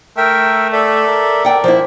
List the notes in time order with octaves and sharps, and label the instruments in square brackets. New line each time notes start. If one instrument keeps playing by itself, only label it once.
[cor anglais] A3 [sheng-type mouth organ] A#4 E5 G5
[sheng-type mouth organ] A4 D5 E5
[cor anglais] A#4
[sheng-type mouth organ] D5 [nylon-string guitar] F#5 G5
[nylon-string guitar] F3 E4